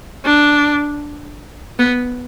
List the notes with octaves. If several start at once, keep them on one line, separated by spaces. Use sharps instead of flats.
D4
B3